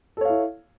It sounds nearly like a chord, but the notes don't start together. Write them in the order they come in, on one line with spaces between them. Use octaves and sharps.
A4 C#5 F5 E4